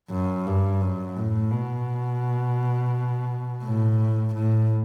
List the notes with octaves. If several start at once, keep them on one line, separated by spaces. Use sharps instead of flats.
F#2
G2
F#2
A2
B2
A2
A2